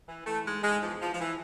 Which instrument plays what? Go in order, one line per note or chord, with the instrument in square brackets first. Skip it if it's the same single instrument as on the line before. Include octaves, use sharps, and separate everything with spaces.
[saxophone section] E3
E3 A3
G#2 G#3
G#2 G#3
E2 F3
E2 F3
F3
E3